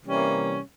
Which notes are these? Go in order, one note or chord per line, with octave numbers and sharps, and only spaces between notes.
C3 E3 G3 A#3 C#4